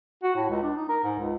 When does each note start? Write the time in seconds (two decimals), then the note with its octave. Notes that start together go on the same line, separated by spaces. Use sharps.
0.23 F#4
0.36 A2
0.50 C#2
0.63 D4
0.76 D#4
0.89 A#4
1.04 G#2
1.19 C#2